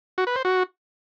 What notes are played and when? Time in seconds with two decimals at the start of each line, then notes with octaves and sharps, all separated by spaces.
0.18 F#4
0.27 B4
0.36 C5
0.45 F#4